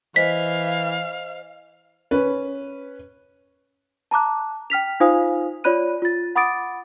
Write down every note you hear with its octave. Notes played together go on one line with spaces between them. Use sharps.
E3 C5 D#5 F5 B6
C#4 B4
A5 A#5 D6 F#6
G5 F6 B6 F7
D#4 F4 C5 F5 G#5 D#6
F4 C#5 D5 B5 F#6 D#7
F4 A6
F#5 B5 D6 D#6 A6 D7